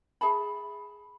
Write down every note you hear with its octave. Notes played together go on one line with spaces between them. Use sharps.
G#4 E5 A5 B5